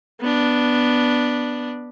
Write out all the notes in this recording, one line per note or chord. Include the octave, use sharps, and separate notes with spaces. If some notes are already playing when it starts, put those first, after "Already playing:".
B3 D4